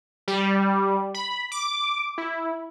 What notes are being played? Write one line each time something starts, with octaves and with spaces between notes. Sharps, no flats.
G3
B5
D6
E4